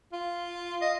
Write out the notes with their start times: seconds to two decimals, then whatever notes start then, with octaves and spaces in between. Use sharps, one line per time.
0.13 F4
0.82 D#5